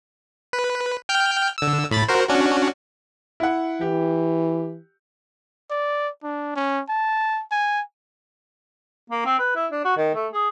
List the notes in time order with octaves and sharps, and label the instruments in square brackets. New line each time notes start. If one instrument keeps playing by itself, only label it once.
[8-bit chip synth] B4
G5 F6 G6
D3 E6
A2 B5 A6
F#4 A#4 C5
C#4 D4 F#4
[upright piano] E4 F#5
[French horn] E3 [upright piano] G4
[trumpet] D5
D4
C#4
A5
G#5
[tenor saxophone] A#3
C4
B4
E4
D4
F#4
D#3
A3
G#4